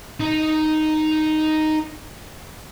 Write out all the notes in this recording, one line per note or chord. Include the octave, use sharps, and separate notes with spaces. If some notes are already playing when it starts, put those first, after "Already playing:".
D#4 A#5